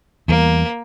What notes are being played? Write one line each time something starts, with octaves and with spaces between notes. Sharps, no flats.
E2 E3 G3 A#3